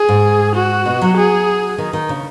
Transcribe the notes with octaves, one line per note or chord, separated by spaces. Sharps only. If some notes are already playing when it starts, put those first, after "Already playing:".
Already playing: G#4
G#2
F#4
B2
F#3
G#4
D#3
D#3
C#3